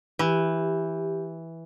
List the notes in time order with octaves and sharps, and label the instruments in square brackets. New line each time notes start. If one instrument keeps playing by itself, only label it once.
[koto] E3 [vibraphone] G4